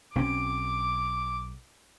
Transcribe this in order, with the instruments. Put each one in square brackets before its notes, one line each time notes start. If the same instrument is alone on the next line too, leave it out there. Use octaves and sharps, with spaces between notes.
[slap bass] B1 C4 C#4 [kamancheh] D6